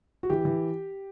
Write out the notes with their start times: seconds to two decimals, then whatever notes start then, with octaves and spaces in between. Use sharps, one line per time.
0.23 F#4
0.30 E3 G4
0.45 E3